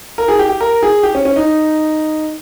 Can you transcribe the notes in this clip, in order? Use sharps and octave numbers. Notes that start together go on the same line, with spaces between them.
A#4
G#4
G4
G4
A#4
G#4
G4
C#4
C#4
D#4